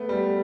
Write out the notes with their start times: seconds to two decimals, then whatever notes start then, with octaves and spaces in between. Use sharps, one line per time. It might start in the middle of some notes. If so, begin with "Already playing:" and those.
Already playing: A3 B3
0.09 G3